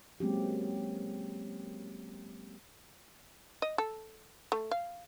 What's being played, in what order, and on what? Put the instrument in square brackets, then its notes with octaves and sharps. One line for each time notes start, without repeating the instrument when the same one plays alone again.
[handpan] F#3 G#3 A#3 C4 C#4 G4
[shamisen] D#5
A4
A3
F5